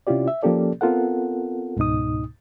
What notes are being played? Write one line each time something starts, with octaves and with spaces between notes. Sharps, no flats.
C3 C#4 E4 F4 G4 D5
E5
F3 A#3 C#4 G4 A4 D5
B3 C4 F4 A4 A#4 F#5
C#2 G#2 B2 D#4 D#6